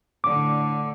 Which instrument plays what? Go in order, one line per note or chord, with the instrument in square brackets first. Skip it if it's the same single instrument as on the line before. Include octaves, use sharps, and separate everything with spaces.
[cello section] A2 D3 [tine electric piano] D6